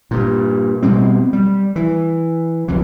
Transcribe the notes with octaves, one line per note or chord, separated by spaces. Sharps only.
G2 A#2
B2 G3 G#3 C4
G3
E3
B1 F2 B2 E3